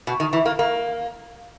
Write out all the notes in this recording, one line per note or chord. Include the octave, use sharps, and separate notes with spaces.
B2
D#3
E3
A#3
A#3